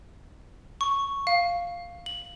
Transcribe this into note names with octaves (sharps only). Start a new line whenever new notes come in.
C#6
F5
F#7